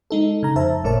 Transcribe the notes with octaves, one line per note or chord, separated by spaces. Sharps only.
G#3 D#4 A4
C#3 A#5
F2 C5 E5 A5
G#1 A#2 A3 A#4 C#5 A5